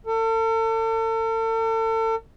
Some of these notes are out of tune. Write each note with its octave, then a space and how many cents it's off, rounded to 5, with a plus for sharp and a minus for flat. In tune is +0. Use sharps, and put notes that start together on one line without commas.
A4 +40